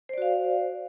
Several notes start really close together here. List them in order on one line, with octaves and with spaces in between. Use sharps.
C5 D5 F#4 F5